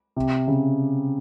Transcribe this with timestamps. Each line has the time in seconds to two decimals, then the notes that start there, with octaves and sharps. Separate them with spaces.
0.16 C3
0.48 C#3